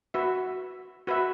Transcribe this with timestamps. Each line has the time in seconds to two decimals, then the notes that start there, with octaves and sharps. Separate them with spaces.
0.14 F#4 B4 E5
1.07 F#4 B4 E5